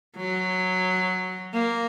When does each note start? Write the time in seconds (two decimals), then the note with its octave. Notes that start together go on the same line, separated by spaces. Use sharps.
0.17 F#3
1.53 A#3